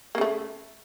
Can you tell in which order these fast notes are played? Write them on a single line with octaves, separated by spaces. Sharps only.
A#3 C#3 A3